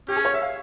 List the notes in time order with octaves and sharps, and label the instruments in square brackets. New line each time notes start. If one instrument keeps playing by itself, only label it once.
[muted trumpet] C#4 [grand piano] G4
[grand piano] G#4
C#5
E5
F5